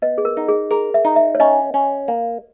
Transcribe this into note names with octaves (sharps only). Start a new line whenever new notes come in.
B3 D#5
G#4
A#4
D#4
G#4
G#4 A#4
E5
D#4
E5
C#5
C#4 D#5
C#4
A#3